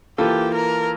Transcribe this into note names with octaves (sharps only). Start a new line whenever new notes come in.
E3 A#3 F4 G4 A4
A#4